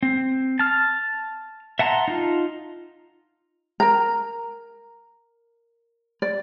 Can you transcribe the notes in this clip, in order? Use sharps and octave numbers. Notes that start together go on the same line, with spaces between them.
C4
A5 F6
E5 F#5 A5 A#5 C6
D#4 F4
A#4 A#5
D5